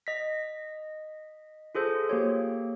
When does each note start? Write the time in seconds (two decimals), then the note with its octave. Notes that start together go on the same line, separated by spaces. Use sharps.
0.07 D#5 B6
1.75 F4 G#4 A4 C5
2.09 A#3 G4 C#5